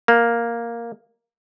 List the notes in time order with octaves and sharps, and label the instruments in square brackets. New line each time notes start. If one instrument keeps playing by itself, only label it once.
[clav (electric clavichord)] A#3